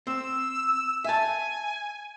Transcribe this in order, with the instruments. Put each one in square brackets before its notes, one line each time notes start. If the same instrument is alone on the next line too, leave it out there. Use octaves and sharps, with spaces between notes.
[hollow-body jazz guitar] C4 [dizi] E6
[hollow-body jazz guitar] E5 A5 [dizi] G#5